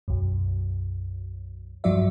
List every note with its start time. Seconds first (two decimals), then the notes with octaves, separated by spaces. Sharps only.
0.08 B1 F#2
1.84 G2 F3 F#3 F#4 D5 E5